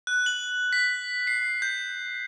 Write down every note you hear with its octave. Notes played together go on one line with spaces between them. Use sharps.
F#6
F#7
B6
C7
G6